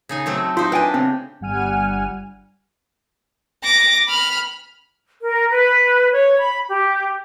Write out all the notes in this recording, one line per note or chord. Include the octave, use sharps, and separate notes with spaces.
C#3 D#4 G#5
F#3 A3 C4
E6
D#4 F4 C5
D4 G4 B4 G5 G#5
C#3 C4
G1 G3 F#5 G#5 F6 D#7
D6 A#6
B5 F6
A#4
B4
C#5
B5
G4